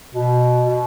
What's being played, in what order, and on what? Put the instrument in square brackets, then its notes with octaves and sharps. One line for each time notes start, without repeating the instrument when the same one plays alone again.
[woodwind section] B2
B2